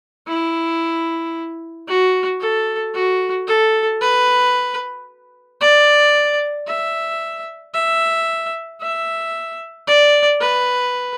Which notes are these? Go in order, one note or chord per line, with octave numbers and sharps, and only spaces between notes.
E4
F#4
A4
F#4
A4
B4
D5
E5
E5
E5
D5
B4